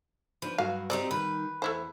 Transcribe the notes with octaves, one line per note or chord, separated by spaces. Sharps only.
F3 D4 F4 B4
G2 F#3 F#4 F5
C4 D#4 G4 D5
D#3 G3 B4
E2 A3 E4 C5